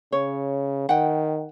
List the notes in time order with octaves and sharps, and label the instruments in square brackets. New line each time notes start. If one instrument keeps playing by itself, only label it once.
[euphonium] C#3 [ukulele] C#5
[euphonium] D#3 [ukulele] F#5 G5